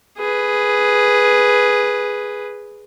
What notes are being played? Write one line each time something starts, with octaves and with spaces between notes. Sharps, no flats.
G#4 B4